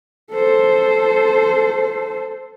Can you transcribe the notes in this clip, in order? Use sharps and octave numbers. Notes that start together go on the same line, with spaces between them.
A4 C5